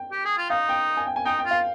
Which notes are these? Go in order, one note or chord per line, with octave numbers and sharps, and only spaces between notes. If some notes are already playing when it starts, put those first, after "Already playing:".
Already playing: G5
G4
G#4
F4
D#4 F5
G5
G#5
G5
G#5
D#4 G5
G5
F4
F5